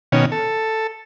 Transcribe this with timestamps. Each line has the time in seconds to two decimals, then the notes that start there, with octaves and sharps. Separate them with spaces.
0.12 B2 D#3 C#4
0.32 A4